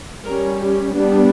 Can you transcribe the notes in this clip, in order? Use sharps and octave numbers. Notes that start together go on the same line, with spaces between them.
G3 C#4 A#4
G4
G3 B3 D4